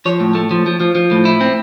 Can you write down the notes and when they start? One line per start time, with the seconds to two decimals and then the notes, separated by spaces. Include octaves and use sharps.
0.05 F3 C#5
0.20 A2
0.35 A3
0.51 F3
0.66 F3
0.80 F3
0.95 F3
1.11 A2
1.25 E4
1.41 C4